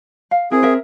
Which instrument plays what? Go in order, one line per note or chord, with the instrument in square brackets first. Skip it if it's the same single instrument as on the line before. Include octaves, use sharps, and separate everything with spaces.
[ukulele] F5
[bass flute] C4 [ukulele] E4 A#4 G#5 [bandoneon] G#4
[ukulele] A#4 E5